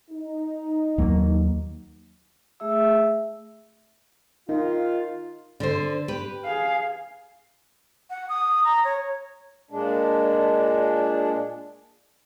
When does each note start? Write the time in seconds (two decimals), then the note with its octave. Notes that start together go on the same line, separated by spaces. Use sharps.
0.11 D#4
0.98 D#2 F#3 A#3
2.60 A3 G#4 E5 E6
4.49 D#3 D#4 F4
5.60 D3 C5
6.08 G4 B4
6.45 G#4 F5
8.10 F#5
8.29 D#6
8.64 A#5
8.85 C#5
9.71 A#2 G#3 D4